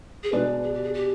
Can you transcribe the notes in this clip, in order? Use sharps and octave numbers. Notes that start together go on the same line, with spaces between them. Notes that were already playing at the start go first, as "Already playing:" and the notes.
G#4
B2 G#3 D4 B4
G#4
G4
G#4
G4